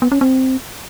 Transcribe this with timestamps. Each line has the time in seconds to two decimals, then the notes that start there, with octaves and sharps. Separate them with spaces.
0.02 B3
0.12 C#4
0.21 C4